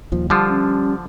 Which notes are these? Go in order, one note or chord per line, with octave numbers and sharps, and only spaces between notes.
D#1 D#2 F3
D3 F3 G3 F4
C#4